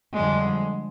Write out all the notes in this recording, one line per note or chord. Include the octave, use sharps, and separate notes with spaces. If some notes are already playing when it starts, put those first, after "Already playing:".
F2 D3 G3 G#3